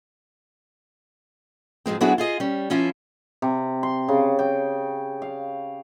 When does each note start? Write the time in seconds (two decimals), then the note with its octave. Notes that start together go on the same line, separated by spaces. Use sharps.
1.86 G#2 F3 G#3 C4
2.01 F#3 B3 D4 E4 F#4 G#4
2.18 F4 G#4 D#5
2.40 G3 C#4
2.70 F3 C#4 E4 F4
3.42 C3
3.83 C6
4.08 C#3
4.39 G5
5.22 F5